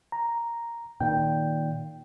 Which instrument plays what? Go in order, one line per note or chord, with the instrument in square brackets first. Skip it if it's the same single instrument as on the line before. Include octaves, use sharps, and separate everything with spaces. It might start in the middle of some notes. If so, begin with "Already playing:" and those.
[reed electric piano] A#5
[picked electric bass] A#2 D#3 [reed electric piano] G5